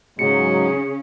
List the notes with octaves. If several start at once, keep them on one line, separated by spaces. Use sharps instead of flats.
G#2 C#3 F#3 C#4 G#4 C#7